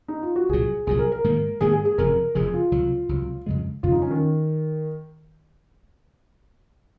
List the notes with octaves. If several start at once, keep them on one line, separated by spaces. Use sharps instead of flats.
D#4
F4
F#4
C2 A#2 F#3 G#4
C2 A#2 F#3 G#4
A#4
A#4
G#2 D#3 A#3
G#2 D#3 A#3 G#4
G#4
G#4
F1 F2 C#3 F3 A#4
F1 F2 C#3 F3 G#4
F4
C#2 C3 F#3
C#2 C3 F#3
F2 C#3 F3 G#3
F2 C#3 F3 G#3 F4
D#4
C#4
D#3